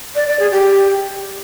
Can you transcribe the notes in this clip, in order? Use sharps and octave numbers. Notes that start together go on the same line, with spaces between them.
D5
D5
G#4
G4